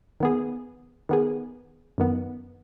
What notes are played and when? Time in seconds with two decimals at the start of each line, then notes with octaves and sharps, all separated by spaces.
0.20 D#3 B3 G#4
1.09 D#3 B3 G#4
1.98 F#2 D#3 B3